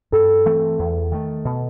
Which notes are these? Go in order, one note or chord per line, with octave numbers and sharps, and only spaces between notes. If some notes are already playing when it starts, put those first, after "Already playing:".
G2 A4
E3 A3 C4
E2
D#3 A3
B2